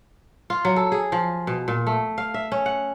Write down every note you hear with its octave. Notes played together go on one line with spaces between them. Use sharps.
F4
F#3
A4
G#4
F3
B2
A#2
A3
F5
E5
C#4
F#5